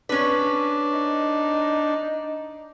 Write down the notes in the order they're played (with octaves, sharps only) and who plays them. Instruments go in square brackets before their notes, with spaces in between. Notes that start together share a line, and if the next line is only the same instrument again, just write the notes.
[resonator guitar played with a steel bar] C#4 B4 [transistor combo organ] D4
[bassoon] D#4